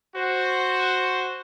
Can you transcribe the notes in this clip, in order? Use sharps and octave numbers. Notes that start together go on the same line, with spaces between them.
F#4 C5